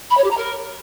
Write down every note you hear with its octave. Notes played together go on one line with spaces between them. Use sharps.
B5
C#5
G4
A#5
A#4